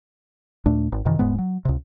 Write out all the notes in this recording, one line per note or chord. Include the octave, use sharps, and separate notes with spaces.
D#2 A#2 A3 D4
G#1
F#2 C3 D#3 E3
D#1 G#2 G#3 B3
F#3
C#2 C3